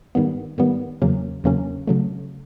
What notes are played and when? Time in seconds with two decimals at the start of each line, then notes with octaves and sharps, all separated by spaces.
0.15 G#2 D#3 G3 B3
0.58 G#2 D#3 G3 B3
1.02 E2 C#3 F#3 A#3 C#4
1.44 E2 C#3 F#3 A#3 C#4
1.87 C#3 F#3 A3